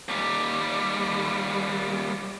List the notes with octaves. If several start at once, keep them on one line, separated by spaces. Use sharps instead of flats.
D#2 G3